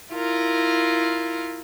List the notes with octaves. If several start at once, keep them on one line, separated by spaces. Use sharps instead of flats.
E4 F4 A#4